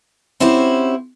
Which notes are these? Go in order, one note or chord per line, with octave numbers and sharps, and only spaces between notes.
C4 C#4 E4 F#4 G4 C5